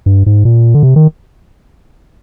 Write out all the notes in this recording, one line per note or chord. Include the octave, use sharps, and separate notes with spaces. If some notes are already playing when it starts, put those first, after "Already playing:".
G2
G#2
A#2
D3
C3
D#3